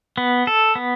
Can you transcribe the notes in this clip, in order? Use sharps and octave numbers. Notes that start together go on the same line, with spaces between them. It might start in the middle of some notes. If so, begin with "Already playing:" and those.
B3
A4
B3